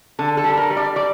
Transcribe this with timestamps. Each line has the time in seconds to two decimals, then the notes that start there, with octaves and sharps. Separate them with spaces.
0.19 D3 A4
0.37 A4
0.44 G3
0.57 A#4
0.70 G3
0.77 D5
0.96 G3 D5